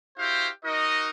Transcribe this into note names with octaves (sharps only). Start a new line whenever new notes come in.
E4 F#4 G4 C5 F5
D#4 F#4 A#4 D#5